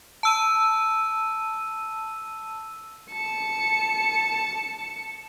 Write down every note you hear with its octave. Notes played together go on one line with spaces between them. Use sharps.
A5 E6 D#7
A5 C#7